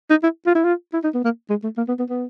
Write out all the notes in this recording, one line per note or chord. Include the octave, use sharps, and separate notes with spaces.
D#4
E4
F4
E4
F4
E4
D#4
B3
A#3
G#3
A3
A#3
B3
B3
B3